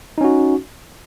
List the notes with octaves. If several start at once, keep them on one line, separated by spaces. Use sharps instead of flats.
C#4 D#4 F#4